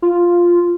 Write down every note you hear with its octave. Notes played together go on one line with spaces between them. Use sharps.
F4